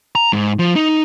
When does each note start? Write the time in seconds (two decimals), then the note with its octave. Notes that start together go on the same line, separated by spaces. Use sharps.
0.15 A#5
0.33 G#2
0.59 F3
0.76 D#4